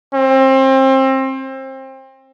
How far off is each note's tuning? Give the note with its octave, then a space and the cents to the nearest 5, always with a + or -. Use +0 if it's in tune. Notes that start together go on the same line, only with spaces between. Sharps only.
C4 +30